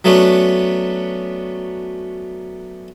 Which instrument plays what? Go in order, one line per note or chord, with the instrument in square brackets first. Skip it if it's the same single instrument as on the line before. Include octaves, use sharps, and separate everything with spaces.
[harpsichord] F#3 A3 B3 C#4 D4